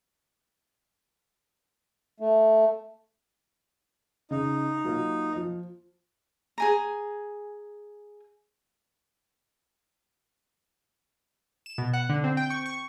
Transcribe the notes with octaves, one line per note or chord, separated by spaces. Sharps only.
A3
C#3 D#4
F#3 A#3 F4
F3
G#4 G#5 A#5
E7
B2
F#5
D3
C4
G5
C#6
C#6